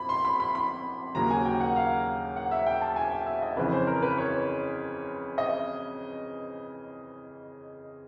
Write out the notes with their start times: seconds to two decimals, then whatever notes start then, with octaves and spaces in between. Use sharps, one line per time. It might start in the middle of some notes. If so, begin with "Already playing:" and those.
Already playing: F2 B5
0.09 C6
0.25 B5
0.40 B5
0.55 B5
1.15 D#2 C#3 F#3 A#3 A#5
1.30 G#5
1.45 G5
1.60 F#5
1.76 F5
2.36 F#5
2.51 E5
2.66 G5
2.82 A5
2.96 G#5
3.12 G5
3.26 E5
3.42 D#5
3.57 F2 C#3 E3 B4
3.72 C5
3.87 A#4
4.02 B4
4.18 C#5
5.38 D#5